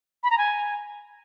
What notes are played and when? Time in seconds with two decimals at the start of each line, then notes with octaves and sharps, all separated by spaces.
0.23 B5
0.31 A#5
0.38 G#5